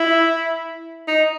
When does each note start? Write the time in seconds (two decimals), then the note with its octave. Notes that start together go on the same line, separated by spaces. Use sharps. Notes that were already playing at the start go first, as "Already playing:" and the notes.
Already playing: E4
1.08 D#4